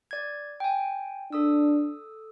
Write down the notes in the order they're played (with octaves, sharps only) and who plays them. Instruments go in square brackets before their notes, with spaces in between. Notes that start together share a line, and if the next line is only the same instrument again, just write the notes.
[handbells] D5 G#6
G5 G#5
[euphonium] D4 [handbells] A4 D#6 E6